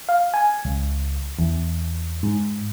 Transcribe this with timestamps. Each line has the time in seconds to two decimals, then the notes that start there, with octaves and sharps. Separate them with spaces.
0.09 F5
0.34 G#5
0.65 C#2
1.39 E2
2.23 G#2